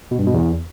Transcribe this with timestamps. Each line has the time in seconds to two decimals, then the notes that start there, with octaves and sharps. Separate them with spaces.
0.11 B2
0.19 G2
0.26 B2
0.34 E2